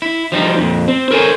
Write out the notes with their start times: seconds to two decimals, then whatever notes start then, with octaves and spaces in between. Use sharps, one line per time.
0.02 E4
0.32 F3 G3 D#4
0.58 F2 A#2
0.88 C4
1.11 A4 A#4 C5 C#5 G#5